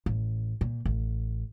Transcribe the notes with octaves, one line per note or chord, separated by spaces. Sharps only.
A1
A#2
A1